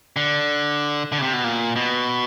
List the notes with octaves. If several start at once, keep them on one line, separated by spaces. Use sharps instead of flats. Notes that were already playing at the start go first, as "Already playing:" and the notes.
D3
D3
C#3
C3
B2
A#2
B2